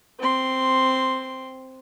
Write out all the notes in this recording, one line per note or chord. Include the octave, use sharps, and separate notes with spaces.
C4 C6